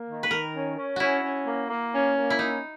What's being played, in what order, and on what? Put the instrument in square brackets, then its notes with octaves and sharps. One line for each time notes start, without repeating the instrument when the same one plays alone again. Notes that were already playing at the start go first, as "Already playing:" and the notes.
Already playing: [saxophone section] A#3
D#3
[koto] B4
[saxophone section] D#3 [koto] A#4
[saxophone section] C#4
C#4
[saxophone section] C#4 [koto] E4 F#4
[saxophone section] C#4
A#3
A#3
C#4
A#3
[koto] E4
[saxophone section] C#4 [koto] D#4